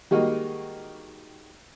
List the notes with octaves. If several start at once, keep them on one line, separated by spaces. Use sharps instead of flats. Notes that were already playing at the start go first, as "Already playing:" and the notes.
D#3 G3 G#3 A#3 F#4 D#5